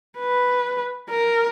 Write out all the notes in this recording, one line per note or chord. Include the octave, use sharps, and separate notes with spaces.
B4
A#4